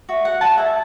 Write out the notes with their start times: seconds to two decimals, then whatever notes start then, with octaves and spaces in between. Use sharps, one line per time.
0.09 F#4 E5
0.25 F#5
0.41 F#4 F#5 A5
0.57 E5 G#5